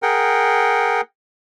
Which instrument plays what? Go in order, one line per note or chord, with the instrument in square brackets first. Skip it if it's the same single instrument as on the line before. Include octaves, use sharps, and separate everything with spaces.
[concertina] G#4 A#4 F#5 G5